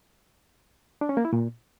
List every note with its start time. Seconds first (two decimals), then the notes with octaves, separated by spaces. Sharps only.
1.01 D4
1.09 C#4
1.17 A#3
1.25 E4
1.33 A#2